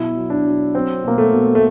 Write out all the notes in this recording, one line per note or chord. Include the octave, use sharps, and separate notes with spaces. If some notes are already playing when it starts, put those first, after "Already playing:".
Already playing: B2 F#3 E4
F#3
D4
F#3
F#3 C4
B2 A#3
A3
B2
A3